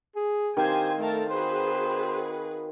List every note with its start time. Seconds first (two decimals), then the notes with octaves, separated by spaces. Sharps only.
0.16 G#4
0.57 D#3 C4 G4 C5 F5 G#5
0.98 A3 A4 A#4 A5
1.30 F#4 G#4 B4 C5